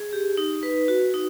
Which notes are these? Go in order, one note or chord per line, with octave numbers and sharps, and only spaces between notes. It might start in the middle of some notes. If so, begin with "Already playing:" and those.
Already playing: G#4
G4
D#4
B4
F#4
D#4